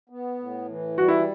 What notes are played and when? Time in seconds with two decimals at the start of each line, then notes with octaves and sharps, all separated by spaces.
0.10 B3
0.39 A2
0.68 E3
0.97 G3 F#4
1.08 E4